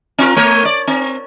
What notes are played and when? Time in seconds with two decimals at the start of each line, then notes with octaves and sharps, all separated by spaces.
0.19 C4 F4 A#4
0.36 A3 A#4 C#5
0.65 D5
0.88 C4